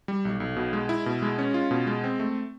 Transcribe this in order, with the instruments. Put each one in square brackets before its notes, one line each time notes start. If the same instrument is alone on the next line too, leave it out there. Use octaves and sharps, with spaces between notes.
[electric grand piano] G3
B1
B1
B2
G#3
E4
B2
G#3
C#4
F4
B2
G#3
C4
A3